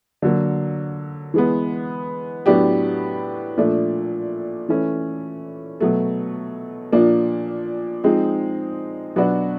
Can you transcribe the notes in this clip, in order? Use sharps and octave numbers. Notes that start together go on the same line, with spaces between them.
D3 F#3 A#3
E3 G#3 B3
A2 F#3 B3 D4 G4
A#2 F3 A3 D4
E3 A3 C#4
B2 F#3 A3
A#2 F3 A#3 D4
F3 G#3 C4 D#4
B2 F#3 B3 D4 F#4